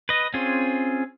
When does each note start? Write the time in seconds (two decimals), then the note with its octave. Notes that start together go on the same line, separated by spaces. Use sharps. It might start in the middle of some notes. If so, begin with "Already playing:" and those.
0.09 B4 D#5
0.34 C4 C#4 F4 G#4